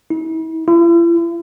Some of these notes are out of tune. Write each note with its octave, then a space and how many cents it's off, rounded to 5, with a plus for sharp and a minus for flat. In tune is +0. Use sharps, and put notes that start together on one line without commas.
E4 -40
E4 +45